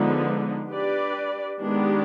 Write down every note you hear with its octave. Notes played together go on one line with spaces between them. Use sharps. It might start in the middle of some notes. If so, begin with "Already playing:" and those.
Already playing: D3 F3 G#3 B3 D#4
D4 G4 B4 D5
D#3 G#3 B3 D4 G4